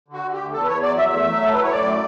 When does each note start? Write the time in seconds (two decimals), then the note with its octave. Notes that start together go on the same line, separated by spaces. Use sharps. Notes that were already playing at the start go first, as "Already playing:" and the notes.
0.08 D3
0.13 F#4
0.23 D3
0.33 G4
0.38 D2
0.53 E2 A4
0.63 B4
0.68 E2 C#5
0.82 F#3 D5
0.97 E2 E5
1.12 A3
1.27 F#3
1.41 A2 A4
1.54 A2 B4
1.63 C#5
1.71 F#2 D5
1.86 A3